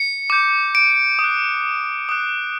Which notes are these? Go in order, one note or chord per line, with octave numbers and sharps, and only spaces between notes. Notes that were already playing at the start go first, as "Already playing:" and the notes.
Already playing: C#7
D6 G6
D7
D#6
F#6
D#6 F#6